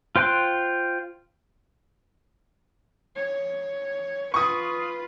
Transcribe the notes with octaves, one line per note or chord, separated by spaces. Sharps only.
F4 C5 G5 C6 F#6
C#5
F4 B4 C#6 D#6